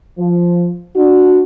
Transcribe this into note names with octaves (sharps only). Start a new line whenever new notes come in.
F3
D4 F#4